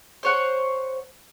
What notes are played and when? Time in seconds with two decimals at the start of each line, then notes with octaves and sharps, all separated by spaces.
0.23 C5 C#5 F#5